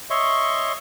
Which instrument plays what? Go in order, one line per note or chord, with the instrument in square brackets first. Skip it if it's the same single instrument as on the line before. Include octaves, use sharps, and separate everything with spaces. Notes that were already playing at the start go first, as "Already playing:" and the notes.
[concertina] C#5 D#5 E5 C6 C#6